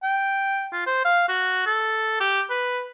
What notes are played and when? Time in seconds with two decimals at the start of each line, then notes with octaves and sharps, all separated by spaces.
0.03 G5
0.73 F4
0.87 C5
1.05 F5
1.29 F#4
1.66 A4
2.20 G4
2.50 B4